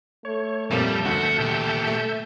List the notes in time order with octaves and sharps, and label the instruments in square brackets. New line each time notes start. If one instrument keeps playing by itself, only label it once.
[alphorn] A3 [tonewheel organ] C#5
[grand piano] F2 A#2 F3 [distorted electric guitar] G3 [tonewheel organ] E5 A5 G6
[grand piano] D2 [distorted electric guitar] F#4 [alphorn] A4
[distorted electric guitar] A#2 G4
[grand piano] A3